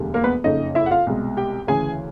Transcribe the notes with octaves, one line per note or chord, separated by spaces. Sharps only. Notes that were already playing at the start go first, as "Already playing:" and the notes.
Already playing: E1 D2 D3 G3
A#3 A#4
B3 B4
F#1 F2 C#3 D#4 D#5
E4 E5
F#5
F4 F5
C2 B2 G#3
G4 G5
D2 C#3 E3 G#4 G#5